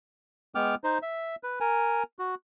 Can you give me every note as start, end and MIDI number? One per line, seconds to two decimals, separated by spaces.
0.55 0.75 56
0.55 0.75 59
0.55 0.75 79
0.55 0.75 86
0.55 0.75 89
0.84 0.98 63
0.84 0.98 72
1.02 1.36 76
1.43 1.59 71
1.60 2.03 70
1.60 2.03 80
2.19 2.35 66